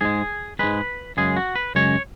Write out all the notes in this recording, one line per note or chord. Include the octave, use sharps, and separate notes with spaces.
G#2 G#3 G#4
G#2 G#3 B4
F#2 C#3 G#3 G#4
F#4
B4
F#2 C#3 G#3 C#5